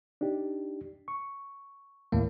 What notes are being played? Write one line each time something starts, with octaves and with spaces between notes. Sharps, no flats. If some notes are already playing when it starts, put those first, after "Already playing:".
D4 D#4 G4
C#6
D#2 A2 A#3